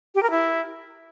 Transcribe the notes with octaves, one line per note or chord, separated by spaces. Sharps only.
G4
A#4
E4